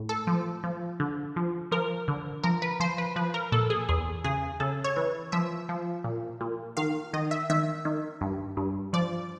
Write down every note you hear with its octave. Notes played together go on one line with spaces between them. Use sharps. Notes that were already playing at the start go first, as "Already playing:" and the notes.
Already playing: A2
A4
F3
F3
D3
F3
F3 A#4
D3
F3 A#4
B4
F3 C5
B4
F3 B4
A#4
A#2 A4
G#4
E2 G#4
C#3 G#4
C#3 A4
C#5
E3
F3 E5
F3
A#2
A#2
D#3 F5
D#3 D#5
E5
D#3 E5
D#3
G2
G2
F3 D5